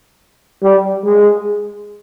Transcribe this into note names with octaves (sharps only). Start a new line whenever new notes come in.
G3
G#3